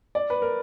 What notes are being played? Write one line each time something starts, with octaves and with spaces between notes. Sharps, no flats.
D5
B4
A#4